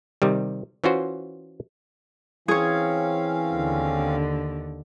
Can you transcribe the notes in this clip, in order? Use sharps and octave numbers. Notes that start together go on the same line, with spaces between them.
C3 D#3 G3
E3 C#4 F4 F#4 C5
E3 C4 C#4 G#4 C#5 F5
D#2 D3